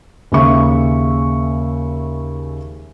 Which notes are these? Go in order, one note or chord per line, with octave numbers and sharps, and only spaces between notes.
D#2 C#3 G#3 E5 C#6